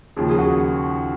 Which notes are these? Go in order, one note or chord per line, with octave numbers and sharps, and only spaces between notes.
D#2 C#3 F3 G#4
G#4
F#4